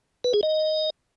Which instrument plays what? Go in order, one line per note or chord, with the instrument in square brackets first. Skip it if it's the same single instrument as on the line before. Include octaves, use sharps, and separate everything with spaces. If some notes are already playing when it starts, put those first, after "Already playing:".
[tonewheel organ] B4
G#4
D#5